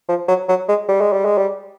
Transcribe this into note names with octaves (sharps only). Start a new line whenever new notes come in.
F3
F#3
F#3
G#3
G3
G#3
G3
G#3
G3